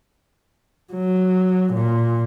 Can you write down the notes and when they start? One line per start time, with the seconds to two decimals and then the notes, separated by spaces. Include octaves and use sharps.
0.93 F#3
1.74 A#2